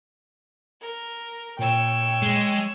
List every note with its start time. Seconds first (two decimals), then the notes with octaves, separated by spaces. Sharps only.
0.81 A#4
1.59 A#2 C#5 G5 E6
2.22 G#3